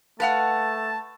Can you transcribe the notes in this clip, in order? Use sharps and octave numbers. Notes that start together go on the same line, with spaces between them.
A3 B4 F5 F#5 A5